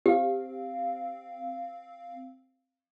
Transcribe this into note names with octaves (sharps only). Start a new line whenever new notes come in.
C4 G4 F5